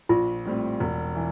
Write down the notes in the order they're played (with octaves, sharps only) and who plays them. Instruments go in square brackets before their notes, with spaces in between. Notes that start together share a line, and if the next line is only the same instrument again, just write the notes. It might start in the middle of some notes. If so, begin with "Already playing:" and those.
[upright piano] A#1 [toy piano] F4
[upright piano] A2 G3 C4
E1
E3